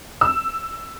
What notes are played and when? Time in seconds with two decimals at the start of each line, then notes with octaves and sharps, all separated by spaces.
0.21 E6